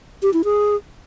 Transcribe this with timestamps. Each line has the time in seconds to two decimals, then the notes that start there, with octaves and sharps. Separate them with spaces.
0.23 G4
0.33 E4
0.44 G#4